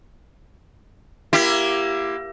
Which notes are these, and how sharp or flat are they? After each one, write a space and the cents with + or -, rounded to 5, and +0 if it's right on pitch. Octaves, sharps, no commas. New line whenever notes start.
A#3 +20 E4 +30 G4 +0